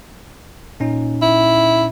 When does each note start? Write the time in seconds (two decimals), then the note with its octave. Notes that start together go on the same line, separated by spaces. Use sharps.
0.80 A#2 C#4 D#4
1.22 E4